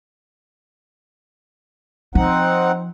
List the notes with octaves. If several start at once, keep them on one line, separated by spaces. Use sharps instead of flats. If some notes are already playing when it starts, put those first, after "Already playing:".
F3 C4 D#4 F#5